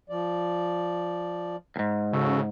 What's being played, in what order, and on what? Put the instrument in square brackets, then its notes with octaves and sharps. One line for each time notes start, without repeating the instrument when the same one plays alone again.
[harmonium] F3 D5
[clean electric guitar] D2 G#2
[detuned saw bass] C#3 [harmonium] F#4 A4